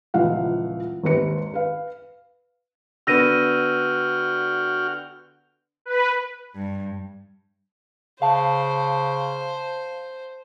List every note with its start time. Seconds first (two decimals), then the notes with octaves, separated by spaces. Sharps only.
0.14 D#1 C#2 E3 F3 F5 F#5
1.03 G#1 D#2 B4 C#7
1.54 B4 F5
3.07 D3 B3 F#4 G5 E6 F6 A#6 D#7
5.85 B4
6.55 G2
8.22 C#3 C5 F5 A5